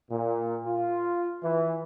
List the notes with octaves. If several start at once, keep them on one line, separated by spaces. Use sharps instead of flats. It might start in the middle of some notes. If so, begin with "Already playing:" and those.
A#2
F4
E3